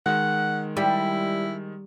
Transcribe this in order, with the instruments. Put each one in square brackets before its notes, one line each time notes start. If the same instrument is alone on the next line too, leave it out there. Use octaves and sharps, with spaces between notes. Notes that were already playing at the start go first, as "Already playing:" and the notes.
[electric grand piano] D#3 G#3 [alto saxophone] F#5
[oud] G3 [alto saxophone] E4